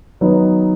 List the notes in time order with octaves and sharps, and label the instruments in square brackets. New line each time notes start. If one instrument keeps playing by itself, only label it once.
[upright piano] D#3 F#3 B3 D#4